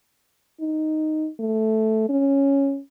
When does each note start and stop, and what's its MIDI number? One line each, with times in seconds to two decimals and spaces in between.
0.61 1.28 63
1.40 2.06 57
2.09 2.79 61